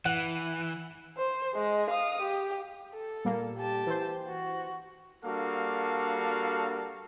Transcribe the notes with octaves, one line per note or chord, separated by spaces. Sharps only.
E3 F#5
C5
G#3 D#5
F5 D#6
G4
A4
A#2 G3 A#3
G4 A5
E3 C5
F#4
G3 A#3 D4 F#4 A4 F5